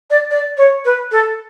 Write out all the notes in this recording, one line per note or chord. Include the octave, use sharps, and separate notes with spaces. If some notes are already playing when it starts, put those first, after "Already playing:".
D5
D5
C#5
B4
A4